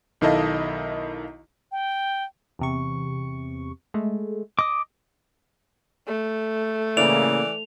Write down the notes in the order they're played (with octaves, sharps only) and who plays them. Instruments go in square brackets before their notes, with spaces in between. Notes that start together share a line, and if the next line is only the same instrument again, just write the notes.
[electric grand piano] B1 D#3 E4 A4 D#5 F5
[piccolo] G5
[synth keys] E2 C3 C#6
G#3 A3
[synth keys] D#5 [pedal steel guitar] D6 D#6
[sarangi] A3
[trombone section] A2 C#3 A#3 [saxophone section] E3 D5 [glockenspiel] F7